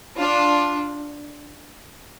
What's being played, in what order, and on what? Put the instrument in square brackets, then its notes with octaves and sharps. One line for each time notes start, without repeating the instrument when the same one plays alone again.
[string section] D4 F4